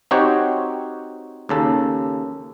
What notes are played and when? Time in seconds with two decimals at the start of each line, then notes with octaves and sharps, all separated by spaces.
0.11 C4 D#4 F#4 G4 C5 C#5
1.49 D#2 C#3 A4